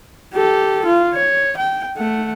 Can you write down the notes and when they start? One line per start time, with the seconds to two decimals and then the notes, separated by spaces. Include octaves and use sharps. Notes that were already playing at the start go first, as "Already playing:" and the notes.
0.34 G4 A4
0.85 F4
1.14 C#5
1.57 G5
1.98 A3 F#5